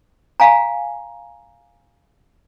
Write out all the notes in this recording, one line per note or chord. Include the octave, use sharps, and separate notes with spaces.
F5 G#5 A#5